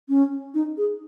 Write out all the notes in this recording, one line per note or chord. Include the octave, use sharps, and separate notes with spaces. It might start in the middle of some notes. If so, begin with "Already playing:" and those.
C#4
D#4
G#4